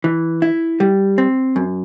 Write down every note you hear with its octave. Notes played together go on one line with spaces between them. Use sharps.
E3
E4
G3
C4
F#2